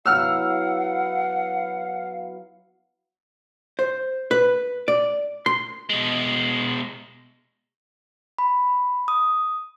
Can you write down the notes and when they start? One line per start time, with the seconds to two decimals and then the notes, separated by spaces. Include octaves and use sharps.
0.06 F#3 B3 E4 F5 F#5 E6 F6
3.79 C5
4.31 B4
4.88 D5
5.46 C6
5.89 B2 G#3
8.39 B5
9.08 D#6